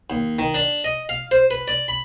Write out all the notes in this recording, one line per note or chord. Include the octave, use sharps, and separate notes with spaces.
D#2
D#3
D4
D#5
F5
C5
B4
D5
B5